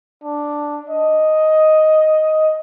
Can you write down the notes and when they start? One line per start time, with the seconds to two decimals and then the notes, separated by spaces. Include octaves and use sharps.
0.24 D4
0.90 D#5